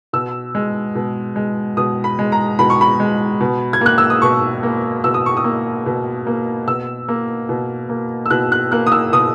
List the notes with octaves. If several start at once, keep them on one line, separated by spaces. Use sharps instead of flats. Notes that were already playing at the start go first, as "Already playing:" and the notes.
B2 E6
G#3
B2
G#3
B2 D#6
B5
G#3
A#5
B2 B5
C#6
B5
G#3
B2
G#6
A#3 F#6
E6
D#6
B2 C#6
A#3
B2 E6
D#6
C#6
D#6
A#3
B2
A#3
B2 E6
A#3
B2
A#3
E6
B2 F#6
F#6
A#3 F#6
D#6
E6
B2 D#6